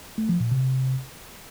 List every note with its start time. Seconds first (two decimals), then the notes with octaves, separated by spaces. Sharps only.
0.18 A3
0.29 F3
0.40 A#2
0.51 C3